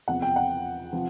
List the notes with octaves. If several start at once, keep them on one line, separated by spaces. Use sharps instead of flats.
E2 C3 F3 F#5
G5
F#5
C3 F3